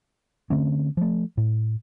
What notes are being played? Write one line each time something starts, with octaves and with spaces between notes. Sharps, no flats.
D3 A3 C4 C#4
F3 A3
A2